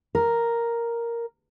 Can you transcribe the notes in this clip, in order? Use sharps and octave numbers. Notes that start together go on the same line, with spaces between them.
A#4